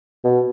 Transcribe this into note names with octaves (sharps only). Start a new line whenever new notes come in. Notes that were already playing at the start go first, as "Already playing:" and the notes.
B2